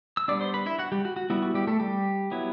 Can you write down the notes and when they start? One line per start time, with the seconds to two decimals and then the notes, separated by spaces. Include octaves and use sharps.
0.17 E6
0.28 G3 B3 D4 D5 D6
0.41 C5 C6
0.54 B4 B5
0.66 E4 E5
0.79 F#4 F#5
0.92 G3 G4
1.05 F#4
1.16 F#4
1.30 G3 B3 E4 F#4
1.42 F#4
1.54 G3 G4
1.67 A3 A4
1.80 G3 G4
2.31 F#3 B3 E4